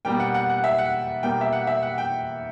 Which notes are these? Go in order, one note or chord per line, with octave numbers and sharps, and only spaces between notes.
B2 G3 A#3 G5
F#5
F#5
F#5
E5
F#5
B2 G3 A#3 G5
E5
F#5
E5
F#5
G5